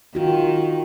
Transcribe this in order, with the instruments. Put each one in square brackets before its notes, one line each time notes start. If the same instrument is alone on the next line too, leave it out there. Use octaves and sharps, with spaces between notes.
[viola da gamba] D#3 [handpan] F4 F#4